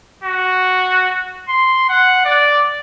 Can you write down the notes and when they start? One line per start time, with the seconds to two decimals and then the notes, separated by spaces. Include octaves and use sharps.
0.24 F#4
1.49 C6
1.89 F#5
2.25 D5